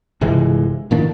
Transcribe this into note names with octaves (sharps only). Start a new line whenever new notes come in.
G1 C3 E3 G#3
A2 D#3 A#3 D4